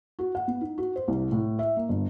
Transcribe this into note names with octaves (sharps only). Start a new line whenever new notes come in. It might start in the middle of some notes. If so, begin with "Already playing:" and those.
F#4
F#5
B3
D#4
F#4
C5
C2
A2
E5
A#3
G1